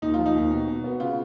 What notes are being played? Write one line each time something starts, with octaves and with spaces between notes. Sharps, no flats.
D#2 D#4
F3 F4
D#4
D#2
B2
B2
B3
C#3 F4